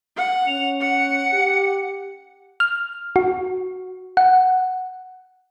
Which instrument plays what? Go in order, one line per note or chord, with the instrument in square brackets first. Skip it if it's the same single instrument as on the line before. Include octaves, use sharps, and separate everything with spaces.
[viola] F#5
[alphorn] C#4 [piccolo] F7
[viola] F#5 [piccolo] C#7
[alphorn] G4
[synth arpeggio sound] F6
F#4
F#5